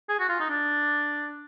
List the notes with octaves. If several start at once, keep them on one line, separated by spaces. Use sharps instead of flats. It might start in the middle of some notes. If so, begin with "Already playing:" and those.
G#4
F#4
F4
D#4
D4